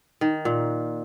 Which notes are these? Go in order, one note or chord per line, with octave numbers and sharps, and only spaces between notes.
D#3
A#2